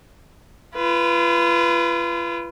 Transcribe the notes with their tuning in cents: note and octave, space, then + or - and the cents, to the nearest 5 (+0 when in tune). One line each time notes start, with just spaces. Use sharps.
F4 -35 B4 -5